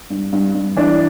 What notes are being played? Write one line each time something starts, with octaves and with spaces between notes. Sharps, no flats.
G2
G2
G2
E3 D4